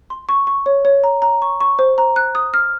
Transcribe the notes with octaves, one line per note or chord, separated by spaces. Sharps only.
C6
C#6
C#6
C#5
C#5
A#5
A#5
C#6
C#6
C5
A#5
F#6
D#6
F6